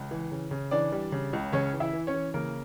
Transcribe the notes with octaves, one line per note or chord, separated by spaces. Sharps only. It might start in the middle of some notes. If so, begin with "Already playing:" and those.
Already playing: C#2
E3
C#3
C#3
E3 D4 D5
G3
C#3
C#2
C#3 C#4 C#5
E3
E4 E5
E3
C#4 C#5
E3
C#3 A#3 A#4